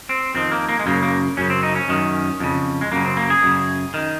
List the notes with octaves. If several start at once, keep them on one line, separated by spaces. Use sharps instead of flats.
C4
F2 D#3 C4
A#3
A#3
G#3
F#2 C#3 A#3
A#3
F#2 C#3 C#4
C4
D#4
C#4
F#2 D#3
F2 C#3
G#3
F#2 C#3 A#3
C4
A#3
G#4
F#2 C#3
D#3